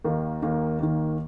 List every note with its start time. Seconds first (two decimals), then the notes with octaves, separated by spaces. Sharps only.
0.04 D#2 D#3 A#3
0.42 D#2 D#3 A#3
0.80 D#2 D#3 A#3